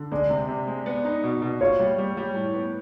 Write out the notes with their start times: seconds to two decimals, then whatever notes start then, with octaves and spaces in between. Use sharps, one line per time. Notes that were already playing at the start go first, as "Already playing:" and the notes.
Already playing: D3
0.12 G#3 D5
0.30 C3
0.48 C3
0.67 G#3
0.86 B3
1.05 D#4
1.24 B2
1.42 B2
1.61 F4 C#5
1.79 G3
1.98 G3
2.17 G3
2.35 A2
2.54 B3